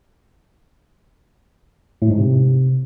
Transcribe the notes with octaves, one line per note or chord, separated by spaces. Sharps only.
A2
G#2
C3